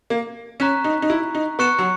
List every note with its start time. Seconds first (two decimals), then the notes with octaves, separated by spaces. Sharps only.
0.10 A#3
0.60 C#4 A#5 C#6 F#6 B6 E7
0.84 D#4
1.02 D#4
1.10 E4
1.35 D#4
1.59 B3 C#6 F#6 C#7 E7
1.79 F#3